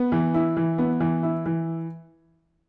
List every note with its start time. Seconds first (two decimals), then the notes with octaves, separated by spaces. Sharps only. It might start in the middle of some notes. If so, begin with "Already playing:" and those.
Already playing: B3
0.12 E3
0.34 E4
0.57 E3
0.78 B3
1.00 E3
1.23 E4
1.46 E3